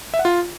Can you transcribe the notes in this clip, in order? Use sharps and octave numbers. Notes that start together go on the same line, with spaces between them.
E5
F#5
F4